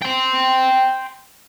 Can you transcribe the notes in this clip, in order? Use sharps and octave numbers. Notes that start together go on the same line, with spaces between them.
G5 C6